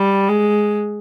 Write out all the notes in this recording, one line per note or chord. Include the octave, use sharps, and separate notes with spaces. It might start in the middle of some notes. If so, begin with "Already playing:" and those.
Already playing: G3
G#3